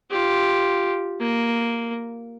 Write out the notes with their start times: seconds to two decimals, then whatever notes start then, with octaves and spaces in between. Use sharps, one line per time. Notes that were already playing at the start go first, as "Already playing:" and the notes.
0.10 F4 G4
1.20 A#3